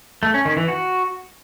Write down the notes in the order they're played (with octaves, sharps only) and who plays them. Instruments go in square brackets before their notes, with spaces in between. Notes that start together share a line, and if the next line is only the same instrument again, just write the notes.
[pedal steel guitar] A3
C#4
D#3
E3
F#4